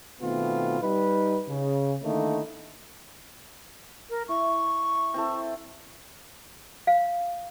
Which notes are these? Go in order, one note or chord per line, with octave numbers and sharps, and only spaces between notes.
B2 D#3 A3 B3 C4 F4
G3 D#4 B4
C#3
D3 D#3 A3 A#3 D#4 E4
A#4
E4 C#6
C4 E4 A4
F5